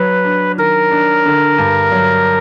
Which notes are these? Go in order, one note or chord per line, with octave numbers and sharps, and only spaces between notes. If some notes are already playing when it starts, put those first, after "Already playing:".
Already playing: F#3 B4
D4
D#3 A#4
D4
D3
G2
F#3